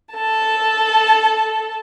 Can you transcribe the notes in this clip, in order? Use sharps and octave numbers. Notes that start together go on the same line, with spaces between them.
A4 A5